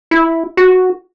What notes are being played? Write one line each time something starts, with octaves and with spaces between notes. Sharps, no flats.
E4
F#4